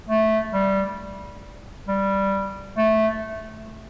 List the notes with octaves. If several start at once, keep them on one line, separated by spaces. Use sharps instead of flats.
A3
G3
G3
A3